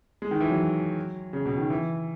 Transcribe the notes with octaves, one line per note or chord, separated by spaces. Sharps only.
G#3
D#3
E3
F#3
C#3
B2
D#3
E3